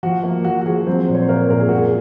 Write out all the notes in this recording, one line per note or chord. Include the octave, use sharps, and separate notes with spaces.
F3 F#4
A#3
F3 F#4
F#4
F3 G#4
F#3 C4 C5
A#2
C#5
C5
A#2 A#3 A#4
A#2 A#4
G#4
F#2 F#4
G#4